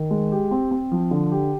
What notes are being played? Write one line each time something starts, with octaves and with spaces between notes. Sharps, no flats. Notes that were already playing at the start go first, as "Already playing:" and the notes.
Already playing: D#3
G#3
G4
C4
C4
F3
D3
G4